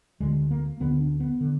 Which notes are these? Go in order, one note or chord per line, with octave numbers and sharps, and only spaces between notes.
D2 D3 G#3
A#3
D2 D3 B3
D4
B3
D3